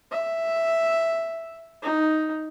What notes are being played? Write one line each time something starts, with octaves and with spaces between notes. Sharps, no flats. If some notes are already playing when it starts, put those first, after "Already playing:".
E5
D#4